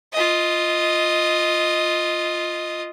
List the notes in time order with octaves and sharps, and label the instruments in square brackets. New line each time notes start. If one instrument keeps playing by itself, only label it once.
[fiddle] F4 D#5